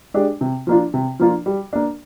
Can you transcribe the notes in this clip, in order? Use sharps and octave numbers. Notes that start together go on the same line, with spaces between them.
G#3 D4 G4
C3
F3 A#3 D4 F4
C3
F3 A#3 D4 F4
G3
A#3 D4